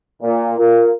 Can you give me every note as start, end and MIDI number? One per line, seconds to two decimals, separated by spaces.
0.22 0.54 46
0.58 0.92 65
0.58 0.92 70